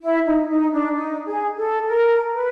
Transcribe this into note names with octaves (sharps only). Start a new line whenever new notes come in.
E4
D#4
D#4
D4
D#4
G#4
A4
A#4
B4